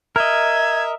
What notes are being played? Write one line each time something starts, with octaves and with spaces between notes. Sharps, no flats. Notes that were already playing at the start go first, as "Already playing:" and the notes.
A#4 D#5 E5 G#6